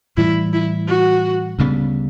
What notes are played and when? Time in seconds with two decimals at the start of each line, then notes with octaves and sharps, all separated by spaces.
0.17 A2 E3 G3 E4
0.53 E4
0.88 F#4
1.59 D2 C#3 G3 B3